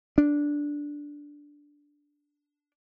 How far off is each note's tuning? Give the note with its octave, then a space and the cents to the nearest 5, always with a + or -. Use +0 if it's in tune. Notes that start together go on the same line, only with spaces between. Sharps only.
D4 -5